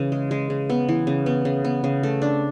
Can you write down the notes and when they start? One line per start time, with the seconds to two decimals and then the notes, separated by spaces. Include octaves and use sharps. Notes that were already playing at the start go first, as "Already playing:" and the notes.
Already playing: C#3 E3
0.12 G#3
0.31 G#3
0.50 C#3
0.70 B3
0.89 E3
1.07 C#3
1.26 B3
1.45 C#3
1.64 B3
1.84 C#3
2.03 A3
2.22 D4